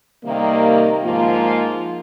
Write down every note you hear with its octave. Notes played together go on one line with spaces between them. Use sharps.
C3 D#3 G3 A#3
G#2 F3 A#3 F4